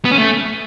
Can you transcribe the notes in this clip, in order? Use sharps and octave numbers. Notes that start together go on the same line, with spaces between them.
B3
C#4
A3